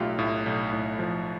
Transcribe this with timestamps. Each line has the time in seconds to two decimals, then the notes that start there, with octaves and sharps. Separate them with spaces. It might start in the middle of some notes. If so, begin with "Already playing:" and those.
Already playing: B1 A2 A3 F4 G4
0.19 A2
0.46 B1
0.73 A2
0.99 F3